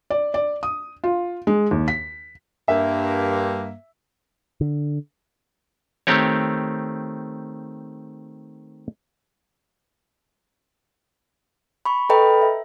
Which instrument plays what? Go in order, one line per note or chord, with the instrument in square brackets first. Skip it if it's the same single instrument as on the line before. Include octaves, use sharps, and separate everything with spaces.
[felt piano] D5
D5
D#6
F4
G#3
D#2
B6
[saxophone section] G2 A#3 [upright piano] E5
[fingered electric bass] D3
[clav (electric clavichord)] D#3 A3 C4 G4 C#5
[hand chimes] B5 C#6
A4 B4 D#5 G5 A#5 B5
E5